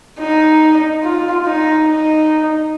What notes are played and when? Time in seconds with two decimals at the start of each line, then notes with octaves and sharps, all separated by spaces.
0.20 D#4
1.03 F4
1.45 D#4
1.87 D#4